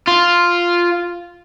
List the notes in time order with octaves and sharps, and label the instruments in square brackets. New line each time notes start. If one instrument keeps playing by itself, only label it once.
[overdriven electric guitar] F4